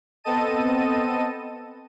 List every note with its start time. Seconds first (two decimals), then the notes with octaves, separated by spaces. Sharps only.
0.24 B3 C4 A4 D#5 A5 D#7